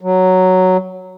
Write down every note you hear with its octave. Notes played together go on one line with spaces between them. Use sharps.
F#3